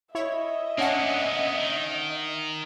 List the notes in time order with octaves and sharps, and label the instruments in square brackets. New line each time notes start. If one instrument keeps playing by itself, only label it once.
[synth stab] E4 C#5 [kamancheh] D#5 E5
[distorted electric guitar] A#3 B3 [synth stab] C#4 D4 F#5
[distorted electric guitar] D#3